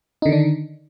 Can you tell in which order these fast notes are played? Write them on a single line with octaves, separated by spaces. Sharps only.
D#4 D3 D#3 D4